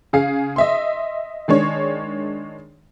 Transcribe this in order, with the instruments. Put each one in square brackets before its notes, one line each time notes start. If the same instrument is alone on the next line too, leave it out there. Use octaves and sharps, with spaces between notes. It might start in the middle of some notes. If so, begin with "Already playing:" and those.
[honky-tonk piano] C#3 G#4 F5 C7
D#5 E5 C6
D#3 G#3 D4 C#5